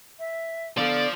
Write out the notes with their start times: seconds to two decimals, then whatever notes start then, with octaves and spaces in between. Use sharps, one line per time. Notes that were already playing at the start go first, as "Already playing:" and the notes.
0.19 E5
0.77 D3 F3 B3 A4 D5 F5